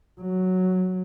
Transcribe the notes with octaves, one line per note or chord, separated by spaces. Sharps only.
F#3